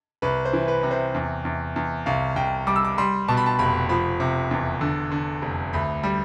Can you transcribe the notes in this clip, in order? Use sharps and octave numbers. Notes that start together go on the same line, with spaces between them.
C2 B4
C5
E3
B4
C3
C5
E2
E2
E2
C2 F5
C2 G5
G3 D6
E6
D6
G3 C6
B2 A5
B5
A5
F1 B5
F3 B5
C3
E2
D3
D3
F1
D2 B5
G3